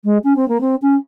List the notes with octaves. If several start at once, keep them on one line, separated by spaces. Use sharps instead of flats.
G#3
C#4
C4
A#3
C4
C#4